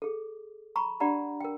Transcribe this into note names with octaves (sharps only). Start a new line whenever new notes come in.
G#4 A4
A#5 B5 C#6
D4 G4 D5 F#5 A#5 B5
A#4 G5